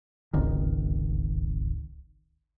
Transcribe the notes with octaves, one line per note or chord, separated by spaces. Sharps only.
D1 G#1 C#2 D#3